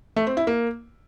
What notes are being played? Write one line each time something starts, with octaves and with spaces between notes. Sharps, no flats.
A3
C4
E4
A#3